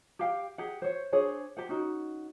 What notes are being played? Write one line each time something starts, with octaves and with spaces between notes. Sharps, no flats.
G4 F5 G5
G4 G#4 F#5
C5 C#5
D4 G#4 C5 C#5
G4 C5 F#5
C#4 D#4 F#4